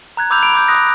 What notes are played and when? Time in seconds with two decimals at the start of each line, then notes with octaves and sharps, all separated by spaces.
0.17 A#5 F#6 G#6
0.30 B5 D6 E6 F#6 G6 F7
0.43 B5 D7 F7
0.55 D6 G6
0.68 D#6 F#6 A#6